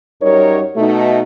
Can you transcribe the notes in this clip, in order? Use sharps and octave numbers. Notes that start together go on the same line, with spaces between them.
F#2 G3 D#4 A#4 C#5
B2 A3 D#4